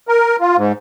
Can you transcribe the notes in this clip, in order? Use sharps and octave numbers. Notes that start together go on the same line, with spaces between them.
A#4
F4
G#2